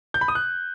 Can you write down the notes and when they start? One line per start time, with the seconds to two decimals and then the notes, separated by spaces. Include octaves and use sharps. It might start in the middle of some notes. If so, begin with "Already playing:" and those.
0.14 G6
0.21 B5
0.28 D#6
0.35 F#6